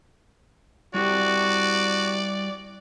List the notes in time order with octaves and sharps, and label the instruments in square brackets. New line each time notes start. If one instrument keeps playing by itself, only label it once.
[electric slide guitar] G3 E4 G4 [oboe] F#4 [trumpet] D5